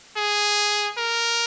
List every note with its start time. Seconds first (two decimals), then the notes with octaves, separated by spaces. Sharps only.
0.17 G#4
0.98 A#4